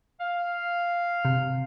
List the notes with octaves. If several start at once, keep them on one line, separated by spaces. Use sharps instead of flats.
F5
C3